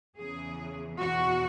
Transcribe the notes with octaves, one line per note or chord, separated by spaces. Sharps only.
E2 C#3 E3 G#4
E2 B2 F#4